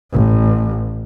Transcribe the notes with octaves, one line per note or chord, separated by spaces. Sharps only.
A1